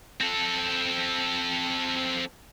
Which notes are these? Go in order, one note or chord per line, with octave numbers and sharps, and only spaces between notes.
C4 A4